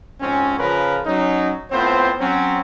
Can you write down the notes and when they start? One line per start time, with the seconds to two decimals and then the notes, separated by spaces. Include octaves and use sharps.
0.21 F2 G#2 C4 C#4
0.59 C#3 F3 C#4 F4 A#4 B4
1.06 F#3 C#4 D#4
1.71 A2 B3 C4 F4 C5
2.20 F#3 C4 C#4